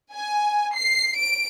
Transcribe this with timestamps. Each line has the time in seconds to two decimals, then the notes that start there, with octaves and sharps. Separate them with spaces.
0.14 G#5
0.77 C7
1.17 D7